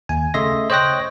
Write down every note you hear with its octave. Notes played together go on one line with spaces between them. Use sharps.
D#2 G#5
C#3 A3 D#5 E5 C6 A#6
C5 C#5 D#5 G5 F#6 A#6